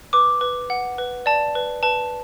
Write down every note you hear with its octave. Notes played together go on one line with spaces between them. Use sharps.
B4 D6
B4
F#5
B4
D5 A5
B4
B4 A5